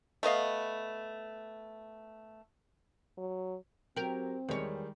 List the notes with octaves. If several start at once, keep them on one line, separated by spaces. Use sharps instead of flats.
A3 B3 D#5 F5
F#3
F#3 C4 G4 A#4
E2 D#3 G3 G#3 C#5